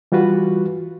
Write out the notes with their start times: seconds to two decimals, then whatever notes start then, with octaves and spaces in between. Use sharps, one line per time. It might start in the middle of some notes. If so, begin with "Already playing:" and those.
0.12 E3 G3 F4 F#4 B4